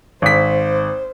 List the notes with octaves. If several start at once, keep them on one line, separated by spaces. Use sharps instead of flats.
G#1 C5 B6